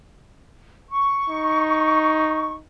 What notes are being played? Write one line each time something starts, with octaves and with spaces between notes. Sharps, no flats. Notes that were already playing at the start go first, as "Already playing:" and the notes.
C#6
D#4